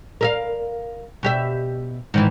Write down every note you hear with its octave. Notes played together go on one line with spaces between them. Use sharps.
A#4 E5 F5
B2 G4 E5
G#2 D#3 E3